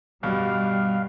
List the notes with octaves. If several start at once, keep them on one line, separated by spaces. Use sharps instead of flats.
G2 B2 G3 F5